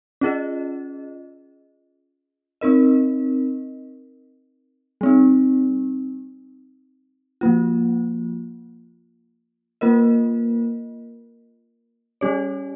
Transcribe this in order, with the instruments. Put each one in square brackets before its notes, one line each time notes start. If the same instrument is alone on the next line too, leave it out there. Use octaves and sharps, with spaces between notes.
[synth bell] C#4 F4 G#4 D#5
C4 D#4 A#4 D#5
G3 C4 D#4
F3 A#3 F4
A#3 F4 A#4 D#5
G3 C#4 G4 C#5